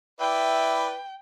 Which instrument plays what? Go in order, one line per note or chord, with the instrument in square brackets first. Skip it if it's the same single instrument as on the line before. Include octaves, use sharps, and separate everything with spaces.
[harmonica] E4 B4 D5 [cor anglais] E5 [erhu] G5